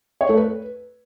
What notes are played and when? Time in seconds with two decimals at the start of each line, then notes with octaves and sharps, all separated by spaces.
0.21 C#5
0.29 A3
0.37 B4